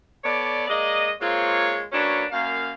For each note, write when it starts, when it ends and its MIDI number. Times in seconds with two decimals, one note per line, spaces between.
0.24 0.64 59
0.24 0.64 69
0.24 0.64 73
0.24 0.64 74
0.68 1.11 56
0.68 1.11 58
0.68 1.11 74
0.68 1.11 75
1.20 1.84 56
1.20 1.84 58
1.20 1.84 60
1.20 1.84 65
1.20 1.84 73
1.92 2.25 54
1.92 2.25 58
1.92 2.25 61
1.92 2.25 62
1.92 2.25 71
1.92 2.25 73
2.31 2.72 42
2.31 2.72 58
2.31 2.72 77